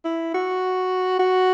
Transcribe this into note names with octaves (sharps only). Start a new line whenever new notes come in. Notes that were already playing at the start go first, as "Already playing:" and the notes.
E4
F#4
F#4